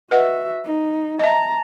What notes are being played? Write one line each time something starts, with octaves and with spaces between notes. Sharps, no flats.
F#4 B4 D#5 E5 F#5
D#4
D#5 E5 A5 A#5